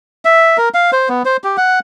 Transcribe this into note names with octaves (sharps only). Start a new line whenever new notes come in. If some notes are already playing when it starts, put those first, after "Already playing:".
E5
A#4
F5
C5
B3
C5
G4
F#5